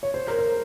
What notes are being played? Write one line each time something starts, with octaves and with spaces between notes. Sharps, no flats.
C#5
C5
A#4
C5